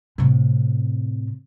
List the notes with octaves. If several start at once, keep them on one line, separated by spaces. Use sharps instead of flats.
A2 C3